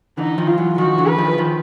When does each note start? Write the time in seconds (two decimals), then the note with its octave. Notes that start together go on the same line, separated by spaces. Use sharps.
0.17 D3 E3 D#4
0.38 D#3 F3
0.47 F4
0.58 E3 F#3
0.78 D#3 F3 F#4
0.98 D3 E3
1.08 B4
1.18 D#3 F3
1.38 D#3 F3